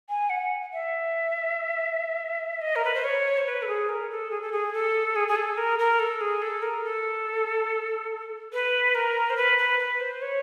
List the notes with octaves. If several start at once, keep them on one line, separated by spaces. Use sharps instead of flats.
G#5
F#5
E5
D#5
A#4
B4
C5
C#5
C5
B4
A4
G#4
A#4
A4
G#4
A4
G#4
A4
G#4
G#4
A4
A#4
A#4
A4
G#4
A4
A#4
A4
B4
A#4
C5
B4
B4
B4
C5
C#5